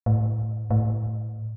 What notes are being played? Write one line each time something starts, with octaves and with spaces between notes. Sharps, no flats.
A2
A2